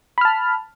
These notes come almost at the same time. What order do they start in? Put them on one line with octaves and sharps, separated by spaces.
B5 F6 A5